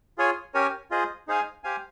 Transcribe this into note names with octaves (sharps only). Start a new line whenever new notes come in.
F4 G#4 C#5 G#5
C#4 G4 A#4 C#5 G#5
F4 G#4 C5 D#5
D#4 G#4 C5 F5 G#5
G4 C5 F5 G#5